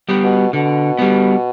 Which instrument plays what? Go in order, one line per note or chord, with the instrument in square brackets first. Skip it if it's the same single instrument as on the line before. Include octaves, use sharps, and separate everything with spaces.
[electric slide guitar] G3 B3
[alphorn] B2
[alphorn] B2 [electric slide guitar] D3
[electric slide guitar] G3 B3